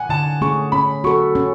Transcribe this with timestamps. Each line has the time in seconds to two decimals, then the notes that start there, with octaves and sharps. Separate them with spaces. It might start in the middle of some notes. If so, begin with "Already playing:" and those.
Already playing: F#5 G#5
0.09 D3 A5
0.41 A3 C#4 G#4 C#6
0.72 C#4 B5
1.04 F#4 A4 C#6
1.35 C#4